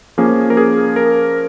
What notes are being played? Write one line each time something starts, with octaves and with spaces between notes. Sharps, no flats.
F3 A#3 C#4 G#4
A#4
G#4
A#4